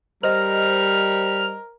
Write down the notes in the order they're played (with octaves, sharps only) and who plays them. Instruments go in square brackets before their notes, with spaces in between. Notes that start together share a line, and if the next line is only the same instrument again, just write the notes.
[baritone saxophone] G3 [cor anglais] A#4 [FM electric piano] C5 D#5 A#6 [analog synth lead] F6